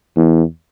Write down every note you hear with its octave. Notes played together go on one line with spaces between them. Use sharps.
E2